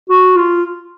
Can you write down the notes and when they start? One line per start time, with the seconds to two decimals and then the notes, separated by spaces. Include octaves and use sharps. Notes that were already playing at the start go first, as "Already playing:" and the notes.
0.10 F#4
0.36 F4